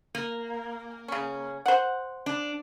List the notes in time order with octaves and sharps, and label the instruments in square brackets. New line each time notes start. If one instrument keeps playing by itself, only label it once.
[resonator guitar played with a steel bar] A#3
[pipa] C#3 C#4
C5 F#5
[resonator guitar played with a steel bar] D4